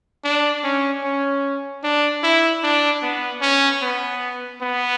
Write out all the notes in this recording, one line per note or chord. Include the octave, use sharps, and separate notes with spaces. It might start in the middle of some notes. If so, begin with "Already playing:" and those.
D4
C#4
C#4
D4
E4
D4
B3
C#4
B3
B3